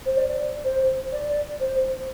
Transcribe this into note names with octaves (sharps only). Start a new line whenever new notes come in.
C5
D5
C5
D5
C5